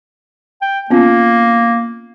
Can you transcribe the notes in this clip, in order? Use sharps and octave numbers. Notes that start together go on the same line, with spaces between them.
G5
A#3 B3 C#4 F4